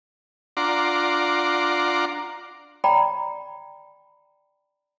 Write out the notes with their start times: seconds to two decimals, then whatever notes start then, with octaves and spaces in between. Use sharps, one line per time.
0.57 D4 F4 F#5 A#5 C6 D6
2.84 D5 G5 A#5 B5